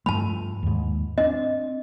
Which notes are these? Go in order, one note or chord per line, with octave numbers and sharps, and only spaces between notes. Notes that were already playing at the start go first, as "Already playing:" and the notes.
G2 F3 A3 A5 B5
D#2 G#2
C4 D4 D#5